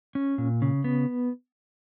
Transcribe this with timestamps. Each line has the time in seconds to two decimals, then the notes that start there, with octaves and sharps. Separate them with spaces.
0.15 C#4
0.38 A#2
0.62 C#3
0.84 B3